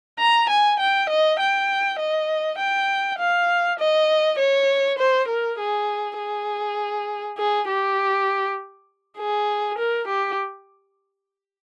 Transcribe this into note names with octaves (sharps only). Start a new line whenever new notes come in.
A#5
G#5
G5
D#5
G5
D#5
G5
F5
D#5
C#5
C5
A#4
G#4
G#4
G#4
G4
G#4
A#4
G4